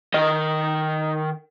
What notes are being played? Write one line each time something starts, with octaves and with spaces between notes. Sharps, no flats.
D#3 D#5